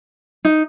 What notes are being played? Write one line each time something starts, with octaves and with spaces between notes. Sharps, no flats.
D#4